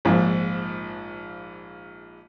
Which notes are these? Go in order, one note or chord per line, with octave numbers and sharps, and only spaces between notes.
A#1 G#2 F3